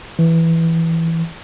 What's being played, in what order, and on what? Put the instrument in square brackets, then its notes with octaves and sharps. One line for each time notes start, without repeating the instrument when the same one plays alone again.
[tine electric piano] E3